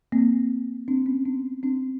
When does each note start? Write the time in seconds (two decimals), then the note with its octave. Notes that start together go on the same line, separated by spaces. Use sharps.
0.12 A#3 C4
0.88 C4 D4
1.06 B3 C#4
1.25 C4 D4
1.63 C4 D4